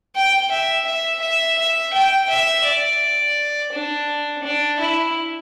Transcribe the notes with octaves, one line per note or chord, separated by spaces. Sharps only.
G5
E5
E5
E5
E5
G5
E5
D5
D4
D4
E4